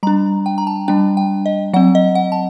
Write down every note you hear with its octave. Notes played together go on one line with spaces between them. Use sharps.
G3 D4 A#5
G5
A#5
A5
G3 D4 G5
G5
D#5
F#3 C4 F#5
D#5
F#5
A5